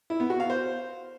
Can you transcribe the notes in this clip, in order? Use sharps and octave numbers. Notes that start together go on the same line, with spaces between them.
E4
B3
F#4
F5
C5